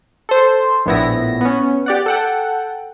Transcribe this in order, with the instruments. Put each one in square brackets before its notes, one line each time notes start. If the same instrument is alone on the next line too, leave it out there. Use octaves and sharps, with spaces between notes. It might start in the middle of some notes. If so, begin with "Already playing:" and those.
[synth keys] A4 C5
A#1 A2 B3 E4 A#6
B3 C#4
G4 D5 F#5
A4 F#5 G5